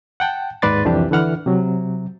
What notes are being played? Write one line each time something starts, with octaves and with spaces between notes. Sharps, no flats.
F#5 G5 A5
D#2 G#2 B4 D5 C6 A6
C2 F2 E3 D4 G4
D3 E3 F#5 F6
C3 F#3